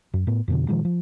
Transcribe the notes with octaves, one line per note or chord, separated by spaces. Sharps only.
F#2
A2 B3
F2 B2 D3
A#2 D#3 F3 G#3
F3